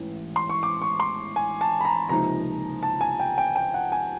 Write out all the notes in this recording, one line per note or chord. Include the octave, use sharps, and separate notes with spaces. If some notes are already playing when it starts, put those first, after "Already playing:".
Already playing: A1 G#2 E3
C6
C#6
D6
C#6
C6
G#5
A5
B5
A#5
C#2 C3 F3 A#3 D#4 A#5
A5
G#5
G5
G5
G5
F#5
G#5